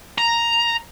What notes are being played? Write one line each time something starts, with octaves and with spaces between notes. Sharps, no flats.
A#5